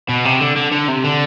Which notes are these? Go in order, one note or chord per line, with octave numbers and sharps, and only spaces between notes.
B2
C3
D3
D3
D3
C3
D3